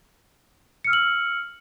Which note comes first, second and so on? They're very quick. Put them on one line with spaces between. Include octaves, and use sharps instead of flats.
C#7 F6 E6 F#7